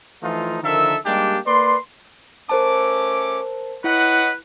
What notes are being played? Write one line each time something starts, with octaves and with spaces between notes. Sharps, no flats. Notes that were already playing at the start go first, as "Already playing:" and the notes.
E3 F3 A3 D#4 F4
D3 D#3 F3 A4 A#4 E5
G3 G#3 A#3 D4 D#4 G4
A#3 B4 D5 C6
A3 C#4 A#4 C5 A5 D6
E4 B4 C#5 D#5 F#5